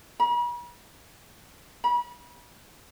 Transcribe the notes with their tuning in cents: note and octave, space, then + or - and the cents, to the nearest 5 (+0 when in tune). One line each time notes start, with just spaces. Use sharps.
B5 -45
B5 -35